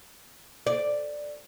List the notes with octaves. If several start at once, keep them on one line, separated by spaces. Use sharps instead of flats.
D5